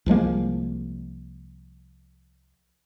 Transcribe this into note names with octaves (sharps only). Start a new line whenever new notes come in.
C2 F3 G#3 A#3